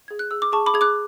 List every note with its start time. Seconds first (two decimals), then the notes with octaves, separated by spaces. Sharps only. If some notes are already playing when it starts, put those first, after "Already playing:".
0.08 G#4 G#6
0.19 F#6
0.31 G#4 E6
0.42 D6
0.52 G#4 A5 C#6
0.66 B5 D6
0.74 G#4 G#6
0.81 D6 F#6